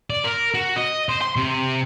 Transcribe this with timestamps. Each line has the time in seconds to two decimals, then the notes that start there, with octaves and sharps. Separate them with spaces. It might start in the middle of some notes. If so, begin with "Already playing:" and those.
0.10 D5
0.24 A#4
0.54 F#4
0.76 D#5
1.09 C5
1.22 C6
1.36 C3